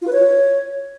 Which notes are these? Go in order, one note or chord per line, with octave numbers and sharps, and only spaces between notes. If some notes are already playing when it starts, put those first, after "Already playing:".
F4
B4
C#5